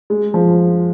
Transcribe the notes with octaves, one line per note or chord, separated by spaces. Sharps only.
G#3
F3